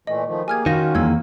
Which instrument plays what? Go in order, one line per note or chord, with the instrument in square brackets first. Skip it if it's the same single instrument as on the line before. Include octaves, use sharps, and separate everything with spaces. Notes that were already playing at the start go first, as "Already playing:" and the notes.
[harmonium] A#2 E3 A3 [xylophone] D#5
[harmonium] D#3 F3 A3
[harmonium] A#3 G4 G#4 [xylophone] G#5 F6 G#6
[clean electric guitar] D#3 [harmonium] C#4 F4 [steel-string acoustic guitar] F#4 [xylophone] F5 A#6
[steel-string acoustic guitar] E2 A#3 [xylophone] E6 G#6